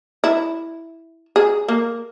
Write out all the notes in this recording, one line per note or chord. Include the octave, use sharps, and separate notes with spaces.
E4
G#4
A#3